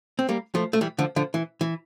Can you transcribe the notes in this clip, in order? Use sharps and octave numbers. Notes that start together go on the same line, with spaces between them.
C4
G3 A#3
F3 A3
A3
E3 G3
D3 F3
D3 F3
E3
E3